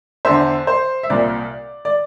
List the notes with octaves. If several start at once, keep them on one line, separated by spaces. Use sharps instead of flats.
E2 D3 C5 E5
C5
E5
C2 A#2 D5
D5